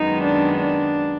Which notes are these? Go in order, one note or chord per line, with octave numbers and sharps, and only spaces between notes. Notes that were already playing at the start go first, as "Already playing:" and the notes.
Already playing: F#2 D#3 G#3 B3 D#4
D4
D4